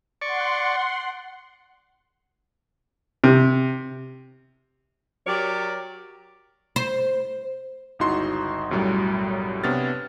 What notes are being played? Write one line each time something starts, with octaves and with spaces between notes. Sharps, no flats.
D5 F#5 C6 C#6
C3
F#3 G4 A#4 C#5 D5
C5
G1 C#2 D#4 E4 F#4 C6
B1 F#2 A2 F#3 G3
C3 B3 D4 C#5 F6 A6